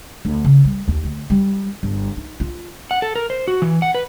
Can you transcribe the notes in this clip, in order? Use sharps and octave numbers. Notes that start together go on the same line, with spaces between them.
D2
C#3
G3
D#2
D2
G3
G1
D#4
F4
F#5
A4
A#4
C5
F#4
E3
F#5
B4